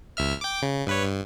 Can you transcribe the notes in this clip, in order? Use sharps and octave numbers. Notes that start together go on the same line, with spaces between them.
C#2 E5 F6
G5 D6
C#3
G2 B4 C#5
G2